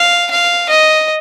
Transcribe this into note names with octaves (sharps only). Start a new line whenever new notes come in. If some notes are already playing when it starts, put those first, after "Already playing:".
Already playing: F5
F5
D#5